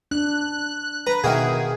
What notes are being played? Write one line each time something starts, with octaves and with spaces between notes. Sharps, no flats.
D4 F#6
B4 A#5
B2 D#3 A#3 F#4 G#4 E5